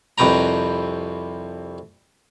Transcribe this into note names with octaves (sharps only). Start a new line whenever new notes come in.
C2 F2 C3 B4 G5 A#5